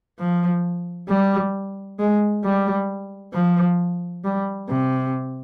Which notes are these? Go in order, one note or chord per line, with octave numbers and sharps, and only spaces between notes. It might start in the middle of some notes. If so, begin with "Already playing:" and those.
F3
G3
G#3
G3
F3
G3
C3